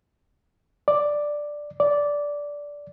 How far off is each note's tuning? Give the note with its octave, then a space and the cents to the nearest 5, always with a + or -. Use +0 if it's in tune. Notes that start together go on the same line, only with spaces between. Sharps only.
D5 +5
D5 -10